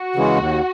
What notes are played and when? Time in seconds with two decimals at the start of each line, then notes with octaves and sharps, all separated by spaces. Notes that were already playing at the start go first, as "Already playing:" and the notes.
Already playing: F#4
0.16 C#3 E3 G#3
0.38 D#2